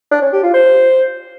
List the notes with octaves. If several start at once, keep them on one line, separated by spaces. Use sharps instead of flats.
D4
C#4
G4
F4
C5